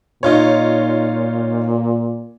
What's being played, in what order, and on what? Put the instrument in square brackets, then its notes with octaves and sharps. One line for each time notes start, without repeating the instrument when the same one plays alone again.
[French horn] A#2 [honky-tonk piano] D#4 F4 C#5